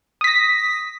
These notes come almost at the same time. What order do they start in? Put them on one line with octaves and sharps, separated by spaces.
D#6 B6 A#6